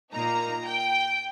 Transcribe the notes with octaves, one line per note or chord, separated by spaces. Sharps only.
A#2 A#3 D#4 A#5
G5